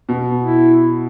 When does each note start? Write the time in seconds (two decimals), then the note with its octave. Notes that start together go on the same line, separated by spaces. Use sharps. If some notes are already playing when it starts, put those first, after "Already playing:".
0.09 B2
0.40 E4